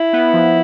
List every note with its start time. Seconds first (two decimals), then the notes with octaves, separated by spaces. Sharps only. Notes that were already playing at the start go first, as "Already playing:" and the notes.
Already playing: E4
0.13 B3
0.33 F3